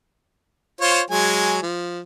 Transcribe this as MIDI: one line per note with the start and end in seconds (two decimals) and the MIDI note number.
0.81 1.01 65
0.81 1.01 72
0.81 1.01 73
1.10 1.58 54
1.10 1.58 56
1.10 1.58 80
1.62 2.00 53